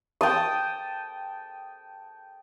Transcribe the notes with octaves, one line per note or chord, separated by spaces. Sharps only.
G5 A5 D#6